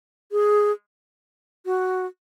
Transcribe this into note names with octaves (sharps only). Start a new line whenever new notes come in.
G#4
F#4